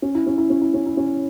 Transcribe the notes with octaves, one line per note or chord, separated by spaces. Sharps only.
C#4
E4
C#4
E4
C#4
E4
C#4
E4
C#4